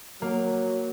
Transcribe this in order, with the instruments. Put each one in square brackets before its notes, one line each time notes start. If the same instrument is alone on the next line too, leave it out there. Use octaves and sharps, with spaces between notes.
[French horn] F#3 [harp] A#3